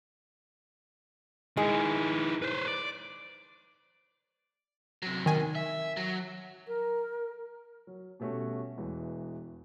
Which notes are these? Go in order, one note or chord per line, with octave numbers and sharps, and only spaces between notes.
D#3 G#3 E4
B4 C5
D5
C3 F#3
D#3 G#5
E5
F#3
A#4
F#3
B2 G3 A3 C#4 F#4
E1 E3